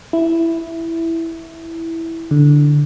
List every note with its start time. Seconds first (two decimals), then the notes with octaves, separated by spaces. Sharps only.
0.13 E4
2.31 D3